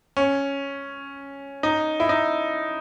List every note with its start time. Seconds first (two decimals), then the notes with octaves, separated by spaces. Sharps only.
0.17 C#4
1.63 D#4
2.00 E4
2.09 D#4